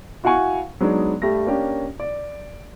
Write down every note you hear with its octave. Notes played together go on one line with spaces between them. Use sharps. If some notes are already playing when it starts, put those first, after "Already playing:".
E4 F#4 F5 F#5 G#5 C#6
F#3 G#3 B3 D4 D#4
G2 G3 A3 A#6
A#3 C#4 D4 G4
D5